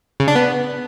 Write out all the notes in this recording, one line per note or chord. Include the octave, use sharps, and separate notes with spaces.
C#3
D4
B3